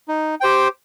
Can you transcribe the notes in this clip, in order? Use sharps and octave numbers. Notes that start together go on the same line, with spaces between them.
D#4
G4 C5 G5